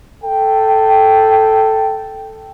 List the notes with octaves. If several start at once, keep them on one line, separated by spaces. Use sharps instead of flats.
A4 G5